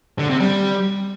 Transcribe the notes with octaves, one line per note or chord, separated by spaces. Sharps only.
D3
C3
G3